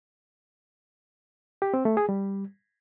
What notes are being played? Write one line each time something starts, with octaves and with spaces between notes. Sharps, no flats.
G4
C4
A3
G#4
G3